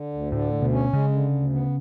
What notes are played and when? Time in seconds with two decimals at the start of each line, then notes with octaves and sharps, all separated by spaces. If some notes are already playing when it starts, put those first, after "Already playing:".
Already playing: D3
0.13 D2
0.32 A2 D3
0.53 D2
0.62 B2
0.73 C#4
0.93 C#3 G#3
1.13 D3
1.32 D2
1.53 B3